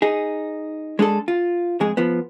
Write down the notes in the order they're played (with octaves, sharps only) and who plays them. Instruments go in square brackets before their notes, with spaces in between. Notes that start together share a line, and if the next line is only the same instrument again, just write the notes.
[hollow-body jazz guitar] D#4 G#4
G#3 D4 G#4 A4
F4
F2 G#2 G#3 G#4
F3 B3